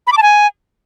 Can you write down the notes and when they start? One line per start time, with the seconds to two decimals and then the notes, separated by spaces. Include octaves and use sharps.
0.07 B5
0.12 D6
0.17 A5
0.22 G#5